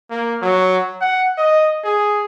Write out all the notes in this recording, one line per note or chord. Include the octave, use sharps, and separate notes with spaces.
A#3
F#3
F#5
D#5
G#4